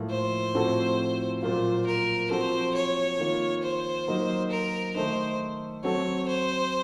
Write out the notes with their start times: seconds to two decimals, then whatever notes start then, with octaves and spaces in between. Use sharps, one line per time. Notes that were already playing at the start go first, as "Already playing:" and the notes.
Already playing: A2 F3 A#3 F4
0.10 C5
0.55 A2 F3 C4 F#4 A4
1.42 A#2 F#3 A#3 F4 C5
1.86 A#4
2.31 F3 C4 F#4 A4 C5
2.75 C#5
3.19 D#3 A#3 F4
3.63 C5
4.08 F#3 A#3 D#4
4.51 A#4
4.95 D#3 A3 D#4 C5
5.83 F#3 C4 F#4 A4 C#5
6.28 C5